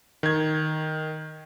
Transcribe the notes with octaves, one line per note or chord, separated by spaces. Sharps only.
D#3 G#6